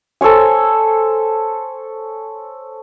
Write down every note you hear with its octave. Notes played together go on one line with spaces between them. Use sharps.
A4 C5 C#5 G#5